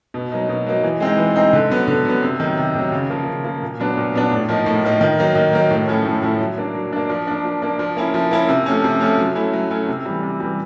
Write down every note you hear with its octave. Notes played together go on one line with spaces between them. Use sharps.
B2
F#3 A#3 D#4
B2
F#3 A#3 D#4
E3
G#3 C4 D#4
E3
G#3 C4 D#4
D3
F#3 B3
D3
F#3 B3
C3
D#3 F#3
C3
D#3 F#3
C#3
F3 A#3
C#3
F3 A#3
A#2
F#3 B3 D4
A#2
F#3 B3 D4
A2
F3 A#3 D#4
A2
F3 A#3 D#4
D#3
F#3 A#3 D#4
D#3
F#3 A#3 D#4
A2
F3 A3 C#4 E4
A2
F3 A3 C#4 E4
F#3
A#3 D4
F#3
A#3 D4
F3
A#3 D4
F3
A#3 D4
F3
A#3 C#4 E4
F3
A#3 C#4 E4
C3
F3 A3 C#4
C3
F3 A3 C#4
F#3
A3 C#4 E4
F#3
A3 C#4 E4
C3
E3 G3
C3
E3 G3